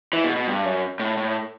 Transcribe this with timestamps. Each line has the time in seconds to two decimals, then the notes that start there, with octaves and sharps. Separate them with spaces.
0.13 E3
0.24 B2
0.36 B2
0.48 G2
0.65 F#2
1.00 A2
1.18 A2